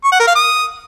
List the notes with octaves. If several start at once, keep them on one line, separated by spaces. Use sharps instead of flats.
C#6
F#5
A#4
F5
D#6